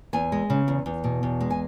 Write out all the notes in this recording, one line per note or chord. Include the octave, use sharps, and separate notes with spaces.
E2 G#5
G#3
C#3
E2
E2
B2
E2
G#3
G#5